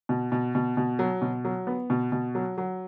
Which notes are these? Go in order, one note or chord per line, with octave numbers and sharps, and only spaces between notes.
B2
B2
B2
B2
F#3
B2
F#3
B3
B2
B2
F#3
F#3